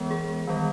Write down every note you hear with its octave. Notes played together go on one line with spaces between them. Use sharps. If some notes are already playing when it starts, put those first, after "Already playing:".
Already playing: E3 G#3 B3 A#4
G#4
D#3 G3 B3